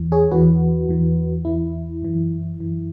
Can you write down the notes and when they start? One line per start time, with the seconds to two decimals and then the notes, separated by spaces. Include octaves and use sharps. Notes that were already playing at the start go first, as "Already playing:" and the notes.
Already playing: E2 E3
0.12 G#4 C#5
0.31 E2 E3 F#4 B4
0.89 E2 E3
1.45 E2 E3 E4
2.02 F#2 E3
2.59 F#2 E3